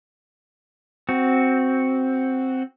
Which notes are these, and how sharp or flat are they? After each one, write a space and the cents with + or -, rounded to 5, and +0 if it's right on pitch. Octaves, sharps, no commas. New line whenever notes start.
C4 +0 F#4 +0